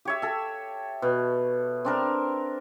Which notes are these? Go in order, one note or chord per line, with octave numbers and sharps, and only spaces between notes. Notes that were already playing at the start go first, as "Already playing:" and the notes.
G4 C#5 E5
A4 E5
B2
C4 D4 A#4